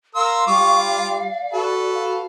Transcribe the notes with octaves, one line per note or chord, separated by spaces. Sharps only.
A#4 F5 C6 E6
G3 F4 C#6 D6
D5
F#4 A4 B4
F5